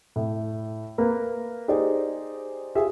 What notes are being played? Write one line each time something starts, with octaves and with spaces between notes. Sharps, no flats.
A2
A#3 A#4 B4
D#4 G4 G#4 C5 D5
F4 G4 G#4 E5